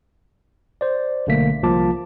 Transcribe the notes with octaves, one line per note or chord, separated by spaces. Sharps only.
C5 D5
B1 D3 A3 A#3 B6
C2 F3 A#3 F4 A5 D6